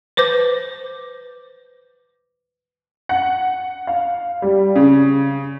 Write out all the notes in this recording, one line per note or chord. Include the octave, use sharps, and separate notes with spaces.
B4 C5 D6 G6
F#5
F5
G3
C#3